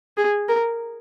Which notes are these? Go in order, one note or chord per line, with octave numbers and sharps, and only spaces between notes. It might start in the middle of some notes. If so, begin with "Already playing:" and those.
G#4
A#4